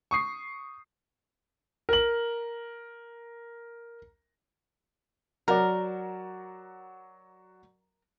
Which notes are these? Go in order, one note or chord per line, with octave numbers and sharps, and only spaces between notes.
C#6 D#6 C7
A#4 F#7
F#3 F#4 A#4 D5